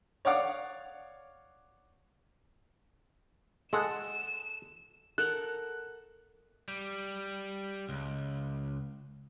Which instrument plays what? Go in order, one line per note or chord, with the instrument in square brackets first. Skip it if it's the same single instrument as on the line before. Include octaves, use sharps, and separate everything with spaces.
[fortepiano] C#5 D5 F5 F#5 D6
[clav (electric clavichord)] G#3 [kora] A4 F#5 [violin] E7
[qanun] A4 A#4 F#5 [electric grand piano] F#6
[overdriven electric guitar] G3
C#2